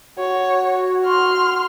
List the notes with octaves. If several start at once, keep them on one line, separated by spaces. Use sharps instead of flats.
F#4 C#5
C6 F6